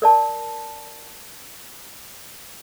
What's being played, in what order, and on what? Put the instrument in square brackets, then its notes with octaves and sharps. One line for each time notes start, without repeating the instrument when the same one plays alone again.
[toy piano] A#4 D5 A5